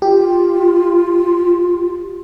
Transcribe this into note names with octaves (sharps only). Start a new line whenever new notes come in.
F4 G4